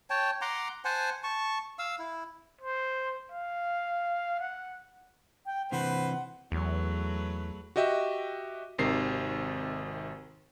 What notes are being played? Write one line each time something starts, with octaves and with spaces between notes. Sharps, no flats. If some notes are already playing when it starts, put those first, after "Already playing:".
C#5 G5 A5
F#5 A#5 C6 D6
C5 F#5 G#5 A5
A5 C#6
F5 E6
E4
C5
F5
F#5
G5
C3 E3 B4 C5 F#5
E2 F#3 A3 B4
F#4 G4 D#5 E5 G5
G#1 C3 D#3 C7